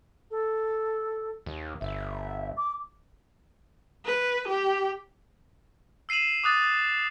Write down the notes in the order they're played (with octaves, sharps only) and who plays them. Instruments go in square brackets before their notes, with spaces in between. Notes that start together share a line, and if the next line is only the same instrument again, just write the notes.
[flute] A4
[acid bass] D#2
[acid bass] G1 [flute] E5
[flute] D6
[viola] B4
G4
[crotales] E6 C7 D#7 E7 F#7
D6 D#6 F#6 A6